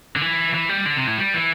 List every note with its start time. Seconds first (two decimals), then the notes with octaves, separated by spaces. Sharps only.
0.16 D3
0.21 E3
0.54 E3
0.69 G3
0.86 D3
0.97 C3
1.07 A2
1.18 G3
1.34 E3